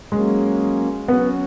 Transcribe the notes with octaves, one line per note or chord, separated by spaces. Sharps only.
F#3 G#3 A#3 C#4
F#3 B3 C#4 F#4